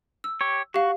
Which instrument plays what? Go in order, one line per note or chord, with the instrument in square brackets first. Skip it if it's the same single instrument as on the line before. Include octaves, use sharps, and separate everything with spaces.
[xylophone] E6
[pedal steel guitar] G4 C#5
[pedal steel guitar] F#4 [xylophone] G4 F5